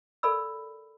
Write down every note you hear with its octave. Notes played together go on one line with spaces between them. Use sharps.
A4 A#4 D5 B5 E6